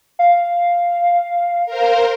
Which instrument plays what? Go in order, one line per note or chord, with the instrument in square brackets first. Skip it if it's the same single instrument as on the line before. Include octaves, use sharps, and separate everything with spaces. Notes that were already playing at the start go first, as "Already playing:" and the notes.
[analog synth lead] F5
[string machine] A#4 C5